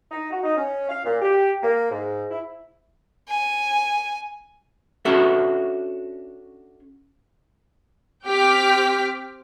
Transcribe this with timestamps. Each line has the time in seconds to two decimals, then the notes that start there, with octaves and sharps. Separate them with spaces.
0.11 D#4
0.31 F#4
0.43 D#4
0.56 C#4
0.89 F5
1.05 A#2
1.21 G4
1.62 A#3
1.90 G#2
2.30 E4
3.28 G#5
5.05 C#4 D4 F#4 A4 E5
8.25 C4 G4 G5 D6 F6 B6